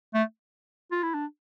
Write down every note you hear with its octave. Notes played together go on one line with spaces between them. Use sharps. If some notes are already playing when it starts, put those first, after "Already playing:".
A3
F4
E4
D4